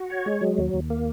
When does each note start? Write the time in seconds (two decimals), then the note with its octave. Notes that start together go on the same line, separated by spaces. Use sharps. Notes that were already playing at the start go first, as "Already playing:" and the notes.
Already playing: F#4
0.10 C#5
0.26 G#3
0.41 F#3
0.58 D#2
0.74 D#2
0.90 A#3